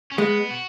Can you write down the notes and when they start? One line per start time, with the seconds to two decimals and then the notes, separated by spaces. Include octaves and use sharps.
0.11 C#4
0.18 G#3 B3
0.51 F#4